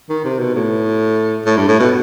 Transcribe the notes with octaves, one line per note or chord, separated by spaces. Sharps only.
D#3
C3
B2
A2
A2
G2
A2
B2